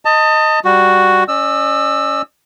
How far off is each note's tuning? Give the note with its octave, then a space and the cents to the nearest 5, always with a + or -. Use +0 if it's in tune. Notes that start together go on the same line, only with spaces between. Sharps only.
D#5 +0 A5 +30
G3 +0 F#4 +0
C#4 +10 D#5 -45 E6 +5